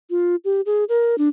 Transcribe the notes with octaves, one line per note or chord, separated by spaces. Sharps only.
F4
G4
G#4
A#4
D4